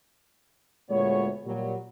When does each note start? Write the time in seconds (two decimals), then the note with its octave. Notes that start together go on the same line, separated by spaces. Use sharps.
0.90 D2 A#2 G#3 B3 C#5
1.45 A#2 F#3 G3